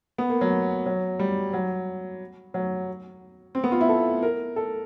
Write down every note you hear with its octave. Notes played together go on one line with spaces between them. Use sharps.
B3
A#3
F#3
F#3
G3
F#3
F#3
C4
B3
F4
E4
A4
A#4
A4